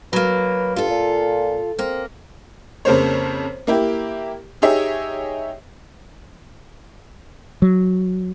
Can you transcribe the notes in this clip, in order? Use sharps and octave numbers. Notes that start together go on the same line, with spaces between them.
F#3 A#3 B4
G2 F4 A4
A#2
A#3 C4
F2 C#3 A#3 C5 C#5
A#3 E4 G4
D#4 G4 G#4 C#5 E5
F#3